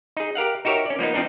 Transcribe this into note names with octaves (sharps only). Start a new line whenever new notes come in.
D#4 G#4
G4 A#4 F5 F#5
D#4 F#4 G4 A#4 C#5 E5
C#4 D5
F3 A#3 B3 D#4
F3 C4 D4 D#4